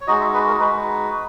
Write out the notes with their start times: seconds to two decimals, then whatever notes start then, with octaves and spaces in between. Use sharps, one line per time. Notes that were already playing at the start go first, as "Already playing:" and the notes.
0.01 C#5
0.07 G#3 D#4 F#4 D#5
0.20 E5
0.34 B4
0.47 A#4
0.60 G#3 D#4 F#4 B4